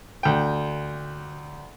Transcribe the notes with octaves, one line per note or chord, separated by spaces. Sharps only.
D2 G5